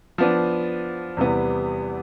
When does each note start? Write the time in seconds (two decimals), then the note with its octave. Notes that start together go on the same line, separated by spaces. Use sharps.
0.18 F3 B3 D4
1.17 E2 C3 G3 B3